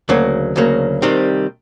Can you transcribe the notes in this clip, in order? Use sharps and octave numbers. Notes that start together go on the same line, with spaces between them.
D2 C#3 F#3 A#3
D2 C#3 F#3 A#3
C2 C3 D#3 G3 C4